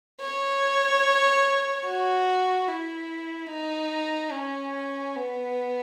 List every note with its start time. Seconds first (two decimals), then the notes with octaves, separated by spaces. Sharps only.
0.20 C#5
1.86 F#4
2.68 E4
3.50 D#4
4.32 C#4
5.16 B3